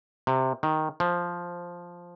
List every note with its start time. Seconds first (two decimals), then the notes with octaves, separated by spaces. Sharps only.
0.27 C3
0.63 D#3
1.00 F3